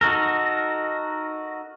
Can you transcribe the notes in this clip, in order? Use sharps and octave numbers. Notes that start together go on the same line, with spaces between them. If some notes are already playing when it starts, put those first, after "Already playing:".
D#4 F#4 A4 A#4